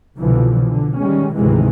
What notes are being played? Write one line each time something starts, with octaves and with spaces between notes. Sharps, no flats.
C2 B2 D3 E3 F3
D3
D#3 G3 G#3 C#4
G#1 D2 C3 D#3 E3 G#3